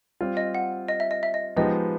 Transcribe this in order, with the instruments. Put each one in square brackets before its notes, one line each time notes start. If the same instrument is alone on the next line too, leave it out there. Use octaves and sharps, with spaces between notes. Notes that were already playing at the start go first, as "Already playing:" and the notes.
[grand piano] G3 C4 F4
[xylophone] D#5
F#5
D#5
E5
D#5
E5
D#5
[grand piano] F3 G#3 B3 D#4 G4 [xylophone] D#5